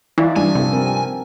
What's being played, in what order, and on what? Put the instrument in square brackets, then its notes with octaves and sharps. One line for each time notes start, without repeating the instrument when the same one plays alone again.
[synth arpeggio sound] E3 [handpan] D#4 F4 D5
[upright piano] G2 D4 [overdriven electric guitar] G#5
[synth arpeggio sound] C3 [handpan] F3 A4
[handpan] C4 A#4